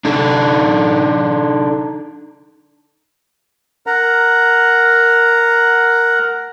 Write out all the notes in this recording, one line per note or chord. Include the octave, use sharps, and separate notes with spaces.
D4 D#4 A4
A#4 F#5 A#5